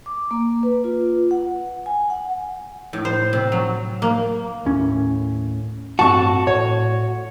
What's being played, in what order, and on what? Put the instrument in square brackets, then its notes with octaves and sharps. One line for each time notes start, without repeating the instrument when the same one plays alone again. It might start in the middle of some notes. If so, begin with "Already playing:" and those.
[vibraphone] D6
A#3
B4
F4
F#5
G#5
F#5
[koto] A2
C5
C3
F#3
A#3
[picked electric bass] D#2 A2 C#4
[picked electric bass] A1 G2 C4 [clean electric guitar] F#4 [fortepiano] A5 C#6
[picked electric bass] A2 [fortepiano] C#5